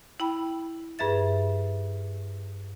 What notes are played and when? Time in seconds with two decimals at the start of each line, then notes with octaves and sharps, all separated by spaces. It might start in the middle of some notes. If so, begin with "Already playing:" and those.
0.20 E4 G5 B5
0.99 G2 G#4 B4 E5 A6